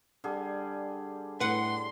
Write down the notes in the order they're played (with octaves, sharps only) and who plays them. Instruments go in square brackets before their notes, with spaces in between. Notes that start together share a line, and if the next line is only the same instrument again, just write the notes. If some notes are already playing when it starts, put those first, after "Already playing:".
[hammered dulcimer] D3 G3 G#4
[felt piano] A2 E4 [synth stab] B4 F#5 [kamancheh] C6